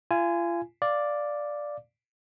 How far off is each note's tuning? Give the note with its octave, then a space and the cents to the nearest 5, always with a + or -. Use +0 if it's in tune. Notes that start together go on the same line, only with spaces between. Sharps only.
F4 -35 G#5 +0
D5 +0 F5 +0